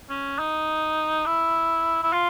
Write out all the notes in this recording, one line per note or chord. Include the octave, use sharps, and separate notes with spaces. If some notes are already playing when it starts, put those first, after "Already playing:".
C#4
D#4
E4
E4
F4